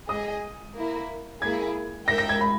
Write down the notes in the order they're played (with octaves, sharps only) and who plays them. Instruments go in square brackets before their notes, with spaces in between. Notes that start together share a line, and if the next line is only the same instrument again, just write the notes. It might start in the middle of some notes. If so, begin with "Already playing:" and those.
[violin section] G#4 D#5 G#5 [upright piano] D#6
[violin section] A#3 E4 A#4
[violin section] A#3 E4 G#4 [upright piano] G#6
[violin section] D#4 A#4 E5 G5 [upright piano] A#6
[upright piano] A#6
G#6
B5